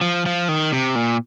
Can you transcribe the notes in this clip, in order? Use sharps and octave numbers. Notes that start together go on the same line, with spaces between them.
F3
F3
D#3
C3
A#2